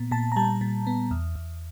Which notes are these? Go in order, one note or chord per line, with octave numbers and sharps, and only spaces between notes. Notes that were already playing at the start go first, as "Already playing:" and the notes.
Already playing: A#2 B3
A#2 A5
A#5
G3 A5
A#2
B3
E2
E2